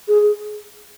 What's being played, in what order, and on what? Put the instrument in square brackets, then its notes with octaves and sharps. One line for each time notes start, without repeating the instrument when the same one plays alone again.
[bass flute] G#4